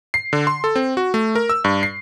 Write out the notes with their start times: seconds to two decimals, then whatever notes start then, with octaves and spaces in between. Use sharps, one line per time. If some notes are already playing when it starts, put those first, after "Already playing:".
0.14 C7
0.33 D3
0.47 C6
0.64 A4
0.76 C4
0.97 F#4
1.14 A3
1.35 A#4
1.50 E6
1.64 G2
1.83 C7